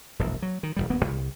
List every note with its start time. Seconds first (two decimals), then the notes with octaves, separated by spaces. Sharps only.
0.19 E1 A#1 F#2
0.42 F#3
0.63 D#3
0.76 E1 C#2 G3
0.90 D#1 G2 A#3 B3
1.05 C2